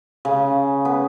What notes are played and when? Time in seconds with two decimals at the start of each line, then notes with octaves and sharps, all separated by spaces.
0.25 C#3
0.85 B3